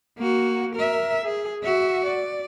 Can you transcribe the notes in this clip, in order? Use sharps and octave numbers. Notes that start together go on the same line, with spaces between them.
A#3 F#4
A#4 E5
G#4
F#4 E5
D5